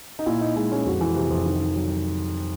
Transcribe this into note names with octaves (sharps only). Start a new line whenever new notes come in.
D#4
A#2 E4
A#2 D#4
G#3 D#4
G#3 C#4
F2 F#4
E3
C3
F2
D#3
D#3
F#3
F#3